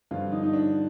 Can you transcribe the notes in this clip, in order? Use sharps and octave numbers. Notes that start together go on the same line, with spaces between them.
G2 D3 F3 F4
D#4
D#4
D4